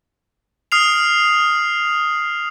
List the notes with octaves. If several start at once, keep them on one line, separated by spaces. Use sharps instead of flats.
D#6 F6 C7 F7